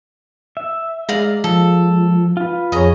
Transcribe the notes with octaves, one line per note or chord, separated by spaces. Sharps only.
E5
G#3 D5 F5 A#5
F3 A4
F4 B4
F2 G#4 C#5 D#5 A#5